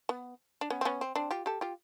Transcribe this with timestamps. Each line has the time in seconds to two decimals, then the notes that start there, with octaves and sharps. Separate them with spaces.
0.09 B3
0.61 D4
0.70 B3 C#4
0.81 C4
0.85 B3 C#4
1.01 C4
1.16 C4 D4
1.31 F4 G4
1.46 G4 A4
1.61 F4 G4